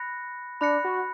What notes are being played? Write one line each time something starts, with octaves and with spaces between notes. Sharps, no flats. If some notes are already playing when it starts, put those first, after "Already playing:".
Already playing: B5 F#6 A#6 C#7
D4 B5 F#6 A#6 C#7
F#4